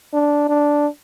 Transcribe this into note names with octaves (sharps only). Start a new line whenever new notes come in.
D4
D4